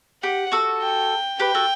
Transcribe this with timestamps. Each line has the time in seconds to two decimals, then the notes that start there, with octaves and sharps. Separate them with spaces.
0.23 G4 F#5
0.52 F#4 A4
0.82 G5
1.40 G4 B4 G5
1.55 F#4 A4